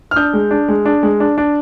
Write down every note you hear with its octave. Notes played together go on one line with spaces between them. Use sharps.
F6
D4 D#6 G6
G#3
D4
G#3
D4
G#3
D4
D4